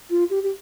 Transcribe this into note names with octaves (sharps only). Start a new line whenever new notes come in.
F4
G4
G4